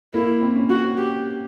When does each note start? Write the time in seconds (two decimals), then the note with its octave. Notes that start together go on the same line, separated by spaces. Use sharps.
0.14 A#3 E4
0.41 C4
0.56 C#4
0.70 F#4
0.98 G4